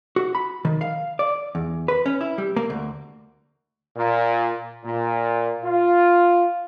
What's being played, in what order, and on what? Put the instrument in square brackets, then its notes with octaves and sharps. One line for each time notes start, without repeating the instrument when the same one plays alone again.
[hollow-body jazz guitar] F#4
B5
D#3
F5
D5
E2
B4
C#4
E4
G3
A#3
D2
[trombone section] A#2
A#2
F4